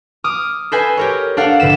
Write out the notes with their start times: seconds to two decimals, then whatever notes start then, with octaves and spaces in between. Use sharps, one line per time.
0.24 D6 D#6 F6
0.72 A4 B4 C5 D#5 G#5
0.97 G4 A#4 C#5
1.37 D4 A4 D5 F5 F#5
1.60 A#1 A2 D3 B4 E7